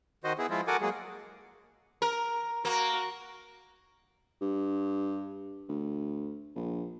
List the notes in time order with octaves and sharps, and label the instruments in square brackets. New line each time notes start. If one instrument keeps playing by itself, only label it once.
[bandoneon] D#3 F#4 C5 D#5
B3 E4 G#4
F3 G#3 E4 F4
F#4 A4 A#4 F#5 G#5 D6
F#3 G#3 A#3 G#4
[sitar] A#4
[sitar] A#3 [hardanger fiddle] F#4 A#4
[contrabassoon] G2
D2
A#1